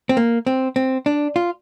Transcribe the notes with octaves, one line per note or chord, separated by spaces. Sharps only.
C4
A#3
C4
C4
D4
F4